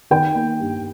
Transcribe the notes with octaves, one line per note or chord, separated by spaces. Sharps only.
D#3 G5
A#3
G2